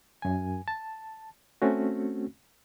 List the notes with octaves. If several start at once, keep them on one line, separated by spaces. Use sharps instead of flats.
F#2 G#5
A5
A3 C4 C#4 F#4